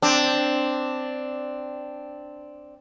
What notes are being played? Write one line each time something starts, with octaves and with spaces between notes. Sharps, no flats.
C4 D4